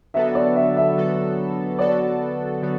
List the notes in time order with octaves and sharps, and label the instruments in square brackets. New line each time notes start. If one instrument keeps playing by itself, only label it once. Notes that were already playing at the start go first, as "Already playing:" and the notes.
[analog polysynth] D3 F#3 B3 F#4 A4 [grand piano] E5
[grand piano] D5
E5
E5
[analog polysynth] D3 F#3 B3 F#4 A4
[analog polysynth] D3 F#3 B3 F#4 A4 [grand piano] D5
[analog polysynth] D3 F#3 B3 F#4